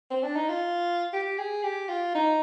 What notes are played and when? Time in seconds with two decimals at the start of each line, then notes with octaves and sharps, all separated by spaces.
0.11 C4
0.24 D4
0.36 D#4
0.49 F4
1.13 G4
1.38 G#4
1.64 G4
1.89 F4
2.15 D#4